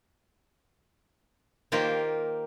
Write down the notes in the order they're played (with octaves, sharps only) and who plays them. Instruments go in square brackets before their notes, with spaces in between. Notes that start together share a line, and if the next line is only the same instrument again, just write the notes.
[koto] D#3 A#3 F4 G4 A#4 C5